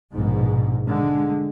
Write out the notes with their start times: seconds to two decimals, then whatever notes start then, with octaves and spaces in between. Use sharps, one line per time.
0.12 A#1 G#2 B2
0.87 D3 G#3